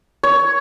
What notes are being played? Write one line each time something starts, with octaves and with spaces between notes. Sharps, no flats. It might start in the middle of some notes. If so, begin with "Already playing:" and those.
C#5